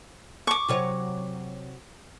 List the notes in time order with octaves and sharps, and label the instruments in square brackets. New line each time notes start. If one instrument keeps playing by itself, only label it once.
[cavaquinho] C#6 D6
[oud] C3 F#3 C#5